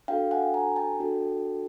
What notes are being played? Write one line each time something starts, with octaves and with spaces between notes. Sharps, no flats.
D4 F#4 A4 F5 G5
F#5 G#5
G#5 A#5
G5 A5
D4 F#4 A4